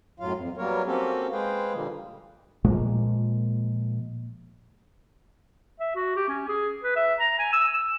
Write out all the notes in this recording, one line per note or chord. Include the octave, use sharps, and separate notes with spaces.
F#2 A2 F#3 F4 F5
F2
F#3 G3 A#3 B3 A#4 C#5
A#3 C4 C#4 F#4 G4 A4
G#3 G#4 B4 C5 F5 G5
A#2 D3 F3 G3 A#3
A#2 F3 G#3 A#3
E5
F#4
G4
C#4
G#4
B4
E5
A#5
G#5
E6
E6